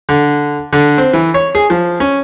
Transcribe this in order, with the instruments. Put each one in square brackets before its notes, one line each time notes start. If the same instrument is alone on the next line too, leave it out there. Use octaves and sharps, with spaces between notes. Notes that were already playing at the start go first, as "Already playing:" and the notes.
[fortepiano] D3
D3
C4
E3
C#5
G#4
F3
C#4